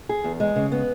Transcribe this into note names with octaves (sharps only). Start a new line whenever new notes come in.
G#4
E2
G#3
C#3
B3